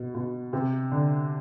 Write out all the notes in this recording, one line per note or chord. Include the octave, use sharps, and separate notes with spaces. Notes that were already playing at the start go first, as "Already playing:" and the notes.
Already playing: B2
B2
C3
D3